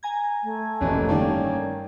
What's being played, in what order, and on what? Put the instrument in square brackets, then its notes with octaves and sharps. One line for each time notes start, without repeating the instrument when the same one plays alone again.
[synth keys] G#5 A#5 G#6
[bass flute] A3
[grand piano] F1 B2 E3 [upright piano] A#3 C#4
[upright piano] G2 D#3 [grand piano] A#3 C#4 D5